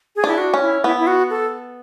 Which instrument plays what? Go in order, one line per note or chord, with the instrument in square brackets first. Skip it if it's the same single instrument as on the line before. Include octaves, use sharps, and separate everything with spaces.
[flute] G#4
[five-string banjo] D4 [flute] E4
[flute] F#4
[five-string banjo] C#4
[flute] E4
[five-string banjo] B3 [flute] E4
[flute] E4
F#4
A4